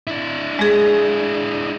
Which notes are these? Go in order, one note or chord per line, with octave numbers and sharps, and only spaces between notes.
D4 E4
G#3 G#4